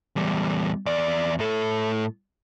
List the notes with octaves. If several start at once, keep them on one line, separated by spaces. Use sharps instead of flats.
E2 G3
E2 D5
A2 A4